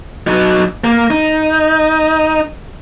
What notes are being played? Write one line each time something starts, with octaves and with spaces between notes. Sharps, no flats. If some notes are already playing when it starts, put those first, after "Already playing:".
F#3 D#4
A#3
D#4